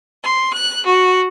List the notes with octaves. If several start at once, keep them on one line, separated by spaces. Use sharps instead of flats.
C6
F#6
F#4